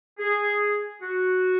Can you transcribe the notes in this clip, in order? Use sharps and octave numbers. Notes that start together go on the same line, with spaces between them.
G#4
F#4